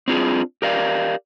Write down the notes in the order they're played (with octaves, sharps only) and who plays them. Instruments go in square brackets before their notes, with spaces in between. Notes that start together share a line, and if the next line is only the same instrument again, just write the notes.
[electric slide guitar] C4 D4 F4 F#4 G#4
G4 A#4 D5 F5